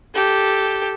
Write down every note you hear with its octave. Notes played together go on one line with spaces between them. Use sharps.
G4 A4